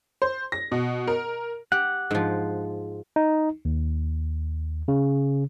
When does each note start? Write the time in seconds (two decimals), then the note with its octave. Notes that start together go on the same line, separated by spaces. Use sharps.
0.22 C5
0.52 A#6
0.72 B2
1.08 A#4
1.72 G4 F#5
2.11 G#2 F3
3.16 D#4
3.65 D#2
4.88 C#3